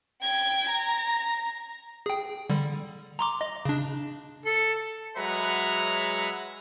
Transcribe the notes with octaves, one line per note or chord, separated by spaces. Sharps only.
G5 G#6
A#5
G#4 G5
D3 G3
A#5 C6 D6
D#5
C#3 D4
A4
F#3 G#3 B4 E5 F#5 A#5